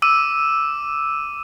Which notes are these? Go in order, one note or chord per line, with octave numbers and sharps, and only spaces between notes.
D6 E6 D#7